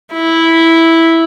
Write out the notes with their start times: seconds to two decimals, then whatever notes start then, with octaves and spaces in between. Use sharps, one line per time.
0.13 E4